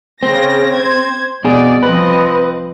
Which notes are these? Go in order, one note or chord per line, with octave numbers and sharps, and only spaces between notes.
C#3 C4 A#6
C5 G#6
C2 B2 G#4 D5
F3 C4 B4 D#5